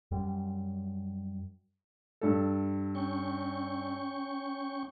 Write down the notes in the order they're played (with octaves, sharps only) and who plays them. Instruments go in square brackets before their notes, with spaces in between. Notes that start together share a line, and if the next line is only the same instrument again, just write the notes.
[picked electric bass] F#2 G3
[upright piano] G2 A4
[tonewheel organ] C#4 G5 C#6